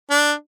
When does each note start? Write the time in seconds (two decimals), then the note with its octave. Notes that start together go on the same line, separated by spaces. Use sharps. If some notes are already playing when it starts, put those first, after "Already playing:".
0.10 D4